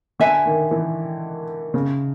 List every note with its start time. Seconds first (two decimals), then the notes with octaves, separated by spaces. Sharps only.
0.20 D3 B4 E5 G#5
0.46 D#3
0.71 E3
1.74 C#3